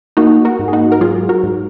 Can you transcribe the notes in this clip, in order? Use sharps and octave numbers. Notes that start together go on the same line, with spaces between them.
A#3 D#4 F#4
F#4 A#4
G#2
G#4
D#4 F#4
A#4
F#3 F4 G#4
F#4 A#4
G#2